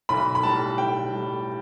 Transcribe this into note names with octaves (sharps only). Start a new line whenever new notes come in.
B1 B5
B5
A2 G3 A5
B1 G5
A2 G3